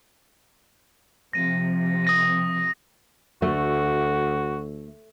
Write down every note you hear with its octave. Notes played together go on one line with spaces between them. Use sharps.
C3 F3 A#6 D#7
D#6 A#6 D#7
D2 A3 F#4